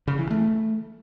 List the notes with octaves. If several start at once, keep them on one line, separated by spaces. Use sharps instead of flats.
C#3
E3
A3